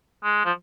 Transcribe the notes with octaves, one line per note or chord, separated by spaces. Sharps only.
G#3
F3